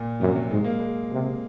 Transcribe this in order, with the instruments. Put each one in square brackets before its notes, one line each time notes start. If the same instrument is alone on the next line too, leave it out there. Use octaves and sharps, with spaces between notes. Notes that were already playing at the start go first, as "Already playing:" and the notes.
Already playing: [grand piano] A#2
[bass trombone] F#2 [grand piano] C3
[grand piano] F#3
[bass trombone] G#2 [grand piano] G#3
[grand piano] A#3
G#3
[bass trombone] C3